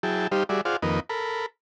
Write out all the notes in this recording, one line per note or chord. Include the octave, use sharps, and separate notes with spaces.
F#3 E4 G#4 G5 A5
G3 D#4 G4 C5 F5
G3 F#4 G#4 D5 E5
F4 G#4 C5 D5 F5 F#5
F2 D#3 A#3 B4 D#5
A4 A#4 B5